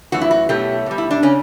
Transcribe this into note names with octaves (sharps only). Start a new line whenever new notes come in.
F#2 E3 A3 F#4
E4
F#4
B2 F#3 A3 G4
B2 G3
E4
D4
C#3 C#4